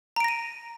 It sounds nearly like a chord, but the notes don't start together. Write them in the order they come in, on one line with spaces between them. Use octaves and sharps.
A#5 D7 A#6 D#7